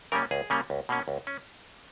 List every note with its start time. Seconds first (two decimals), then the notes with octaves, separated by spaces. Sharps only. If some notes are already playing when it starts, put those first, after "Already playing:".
0.12 C#3 G3 A#3 C#4 A#4
0.31 C#2 G#4
0.50 C#3 G3 A#3 C#4
0.70 C#2
0.89 B2 A#3 C#4
1.08 C#2
1.27 C#4